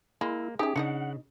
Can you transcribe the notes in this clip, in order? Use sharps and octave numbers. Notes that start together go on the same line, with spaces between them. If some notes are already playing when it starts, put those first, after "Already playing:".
G#3 A#3 E4
C#4 D#4 G4 G#4 E5
C#3 D4 D#4 D#5 F#5